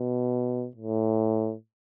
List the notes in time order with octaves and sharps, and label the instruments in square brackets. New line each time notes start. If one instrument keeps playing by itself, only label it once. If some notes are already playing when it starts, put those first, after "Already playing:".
Already playing: [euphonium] B2
A2